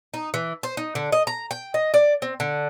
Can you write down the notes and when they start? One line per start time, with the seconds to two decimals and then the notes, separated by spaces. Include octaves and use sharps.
0.14 D#4
0.34 E3
0.63 C5
0.77 D#4
0.95 D3
1.12 D#5
1.27 A#5
1.51 G5
1.74 D#5
1.94 D5
2.22 C4
2.40 D3